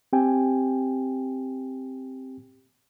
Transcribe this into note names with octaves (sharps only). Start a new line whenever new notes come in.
C4 G4 G5 G#5